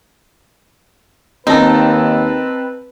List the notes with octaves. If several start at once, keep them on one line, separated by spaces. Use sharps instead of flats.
D#2 C4 D#4 B4 A5